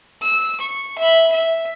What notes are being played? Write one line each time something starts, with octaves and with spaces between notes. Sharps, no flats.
E6
C#6
E5 B5
E5